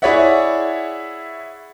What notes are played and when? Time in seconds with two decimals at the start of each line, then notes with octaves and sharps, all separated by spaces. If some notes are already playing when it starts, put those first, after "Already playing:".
0.02 E4 G#4 C#5 D5 E5 F#5